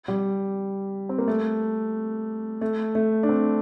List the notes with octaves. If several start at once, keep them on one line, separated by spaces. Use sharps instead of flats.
G3
C4
A#3
A3
A3
A3
D4
C4